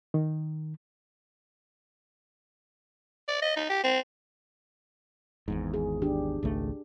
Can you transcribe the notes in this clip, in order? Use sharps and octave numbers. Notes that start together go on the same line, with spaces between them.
D#3
D5
D#5
D#4
G4
C4
G#1 E2 G#2
G#4
D4 G4
G#1 C#2 A3